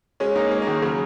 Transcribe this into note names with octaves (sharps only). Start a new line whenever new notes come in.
G#3 C#4
A#3 D#4
G#3 C#4
A#3
D#3 G#3
C#3 F#3